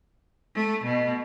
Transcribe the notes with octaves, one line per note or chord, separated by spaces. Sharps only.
A3
B2